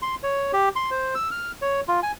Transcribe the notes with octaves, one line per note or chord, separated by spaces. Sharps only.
C6
C#5
G4
C6
C5
E6
F6
C#5
F4
G#5